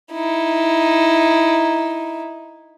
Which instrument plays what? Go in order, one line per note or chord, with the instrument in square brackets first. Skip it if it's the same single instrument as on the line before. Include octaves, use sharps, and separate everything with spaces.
[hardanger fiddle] D#4 E4